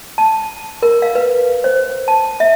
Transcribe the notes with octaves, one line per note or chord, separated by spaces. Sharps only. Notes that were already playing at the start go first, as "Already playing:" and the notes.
A5
A#4
F5
B4
C5
A5
E5